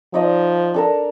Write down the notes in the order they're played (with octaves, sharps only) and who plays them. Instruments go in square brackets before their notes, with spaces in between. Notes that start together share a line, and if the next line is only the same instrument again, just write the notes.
[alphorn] F3 [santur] D#4 D5 D#5
[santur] D4 A4 A#4